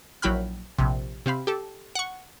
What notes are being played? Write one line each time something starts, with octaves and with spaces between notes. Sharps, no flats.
A#1 F#3 E4 G5 B5 F6
A#1 C3
C3 C4 F5 B5
G4 A4
F#5 C#6